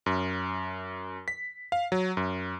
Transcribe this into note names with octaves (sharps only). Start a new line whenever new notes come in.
F#2
B6
F5
F#3
F#2